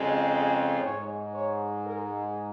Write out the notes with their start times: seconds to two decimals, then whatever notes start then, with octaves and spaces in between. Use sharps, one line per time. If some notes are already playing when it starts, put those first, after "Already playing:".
Already playing: F2 C#3 G#3
0.30 G#4
0.81 G#2 G#3 C#5
1.33 C#5
1.84 A#4